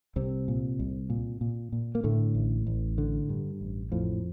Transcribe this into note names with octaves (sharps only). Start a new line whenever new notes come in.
C2 C3 C4
A#2
C2
A#2
A#2
A#2
A#3
A2 D3 A3
A1
A1
D3
G2
A1
F2 A2 F3